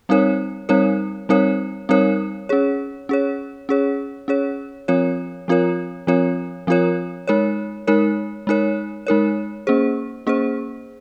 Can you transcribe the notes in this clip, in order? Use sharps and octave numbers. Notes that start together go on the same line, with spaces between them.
G3 C4 D#4 A#4 C#5
G3 C4 D#4 A#4 C#5
G3 C4 D#4 A#4 C#5
G3 C4 D#4 A#4 C#5
C#4 G#4 C#5
C#4 G#4 C#5
C#4 G#4 C#5
C#4 G#4 C#5
F3 C4 F4 A#4 C#5
F3 C4 F4 A#4 C#5
F3 C4 F4 A#4 C#5
F3 C4 F4 A#4 C#5
G#3 D#4 A#4 C#5
G#3 D#4 A#4 C#5
G#3 D#4 A#4 C#5
G#3 D#4 A#4 C#5
A#3 C#4 G#4 C5
A#3 C#4 G#4 C5